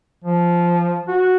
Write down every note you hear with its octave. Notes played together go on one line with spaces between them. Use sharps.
F3
F#4